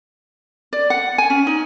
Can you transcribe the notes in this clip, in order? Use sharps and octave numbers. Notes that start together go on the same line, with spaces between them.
D5
F#5
G#5
C#4
D#4